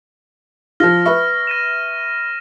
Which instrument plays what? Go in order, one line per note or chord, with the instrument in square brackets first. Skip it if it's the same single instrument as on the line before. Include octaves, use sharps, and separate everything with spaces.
[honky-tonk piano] F3 F4 [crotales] F6 A#6
[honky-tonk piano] B4 E5 C#6
[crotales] A#6 D#7 E7